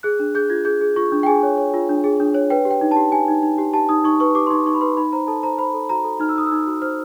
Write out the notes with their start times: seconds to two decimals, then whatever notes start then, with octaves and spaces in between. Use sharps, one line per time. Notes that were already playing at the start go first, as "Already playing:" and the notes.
0.03 G#4 F#6
0.19 D4
0.35 G#4 G6
0.50 F4 G#6
0.65 G#4 G6
0.81 G#4
0.96 F4 C#6
1.12 D4
1.23 G5
1.27 G#4 G#5
1.43 C#5
1.58 C#5
1.74 F4
1.89 D4
2.04 G#4
2.20 D4
2.35 C#5
2.50 B4 G5
2.65 G4
2.71 G5
2.81 D#4
2.91 A5
2.97 G4
3.12 G4 G#5
3.28 D#4
3.43 D#4
3.58 G4
3.73 G4 A5
3.89 D#4 D#6
4.04 D#4 C#6
4.20 B4 C#6
4.35 G4 D6
4.47 C6
4.50 D#4 C#6
4.66 D#4 C#6
4.75 B5
4.81 B4 C6
4.97 D#4 B5
5.13 C5 A#5
5.27 A4 A5
5.43 C5 A#5
5.58 C5 B5
5.74 A4
5.89 F#4 A#5
6.04 A4
6.20 D#4 F6
6.29 E6
6.36 D#4 D#6
6.46 E6
6.52 D#4
6.67 F#4
6.82 C5 F6